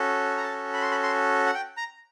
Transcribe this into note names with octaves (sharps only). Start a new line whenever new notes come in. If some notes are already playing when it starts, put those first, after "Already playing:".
Already playing: C#4 F#4 A4
A#5
A5
B5
C6
B5
C6
F#5
G5
A#5